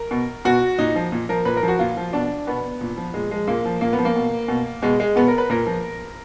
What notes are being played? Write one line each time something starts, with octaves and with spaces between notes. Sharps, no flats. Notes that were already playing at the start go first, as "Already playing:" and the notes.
Already playing: A#4
B2
B2 F#4
A#2 D#4
F3
A#2
F3 A#4
A#2 B4
A#4
F3
F#4
A#2 F4
F3
B2 D4
B2 B3
A#2
F3
A#2 G#3
F3 G#3
A#2 A#3
F3
A#2 A#3
B3
F3
A#3
B2
B2
B2 G#3
G#3
B2 B3
A#4
B4
A#2 A#4
F3